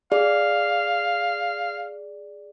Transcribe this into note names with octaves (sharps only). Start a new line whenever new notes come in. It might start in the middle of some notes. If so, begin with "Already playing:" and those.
G#4 D5 F5